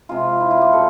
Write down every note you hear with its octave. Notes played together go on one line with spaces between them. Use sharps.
C3 F3 G#3 F4
E4
F4
G4
B2 G3 A4